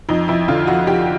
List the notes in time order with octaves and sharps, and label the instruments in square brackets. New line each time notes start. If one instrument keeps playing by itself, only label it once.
[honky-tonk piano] F2 D#4
F2 E4
D3 F4
F2 F#4
F2 G4